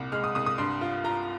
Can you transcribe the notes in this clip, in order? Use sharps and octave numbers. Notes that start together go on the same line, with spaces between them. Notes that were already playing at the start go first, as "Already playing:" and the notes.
Already playing: C2 A#2
G#3 F6
D#6
C2 D#6
D#6
G2 C6
F4
F4 A#5